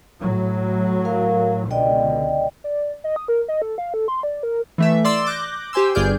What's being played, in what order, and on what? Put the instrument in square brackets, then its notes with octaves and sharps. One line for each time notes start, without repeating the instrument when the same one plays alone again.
[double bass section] A2 F#3
[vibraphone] A#4 F5
[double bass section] C#2 B2 D3 [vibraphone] D5 D#5 G5
[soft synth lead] D5
D#5
D#6
A#4
D#5
A4
F5
A4
C6
D5
A#4
[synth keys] E3 A3 E5
D5 C6 E6 A6
D6 F#6 G6 A#6
G4 C5 G#5 C6 E6
G1 G2 G#4 D5 F6 G6